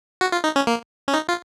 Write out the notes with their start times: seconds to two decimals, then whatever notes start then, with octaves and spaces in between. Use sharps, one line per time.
0.21 F#4
0.32 F4
0.44 D#4
0.56 C#4
0.67 A#3
1.08 C#4
1.14 D#4
1.29 F4